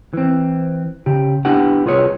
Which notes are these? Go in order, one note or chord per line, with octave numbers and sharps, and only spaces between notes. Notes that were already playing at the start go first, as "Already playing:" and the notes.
E3 C4
C#3 G4
B3 D4 E4 G4 F#5
C2 F4 G#4 B4 C#5